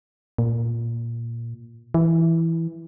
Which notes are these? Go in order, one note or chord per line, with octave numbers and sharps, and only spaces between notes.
A#2
E3